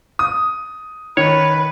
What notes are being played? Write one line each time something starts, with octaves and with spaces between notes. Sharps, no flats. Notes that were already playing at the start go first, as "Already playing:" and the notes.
D#6
D#3 B4 C#5